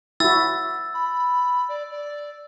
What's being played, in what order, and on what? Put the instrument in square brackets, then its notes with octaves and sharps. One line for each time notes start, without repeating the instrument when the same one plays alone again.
[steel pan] E4 F#4 [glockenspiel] E6 A6
[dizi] B5
D5
D5